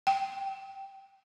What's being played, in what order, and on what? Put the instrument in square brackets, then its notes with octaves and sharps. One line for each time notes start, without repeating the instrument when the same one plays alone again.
[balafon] G5